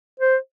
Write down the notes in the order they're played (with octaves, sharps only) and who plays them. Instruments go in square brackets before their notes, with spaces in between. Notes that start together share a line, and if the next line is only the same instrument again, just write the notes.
[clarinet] C5